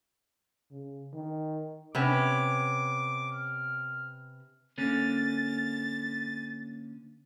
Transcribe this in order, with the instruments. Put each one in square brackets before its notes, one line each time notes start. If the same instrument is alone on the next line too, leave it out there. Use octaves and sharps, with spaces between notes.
[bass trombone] C#3
D#3
[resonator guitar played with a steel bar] C3 B3 C#4 [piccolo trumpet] D6
[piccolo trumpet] F6
[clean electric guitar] D3 A#3 C#4 [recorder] A6